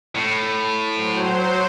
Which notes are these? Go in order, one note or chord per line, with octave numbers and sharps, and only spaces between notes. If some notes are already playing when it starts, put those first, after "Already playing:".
A2
F#3 C5